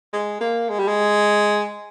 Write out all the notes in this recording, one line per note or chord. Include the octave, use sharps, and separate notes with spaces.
G#3
A#3
G#3
G3
G#3